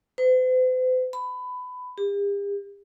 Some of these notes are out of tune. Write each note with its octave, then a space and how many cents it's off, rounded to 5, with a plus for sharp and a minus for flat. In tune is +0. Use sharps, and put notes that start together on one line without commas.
C5 -45
B5 +20
G4 +45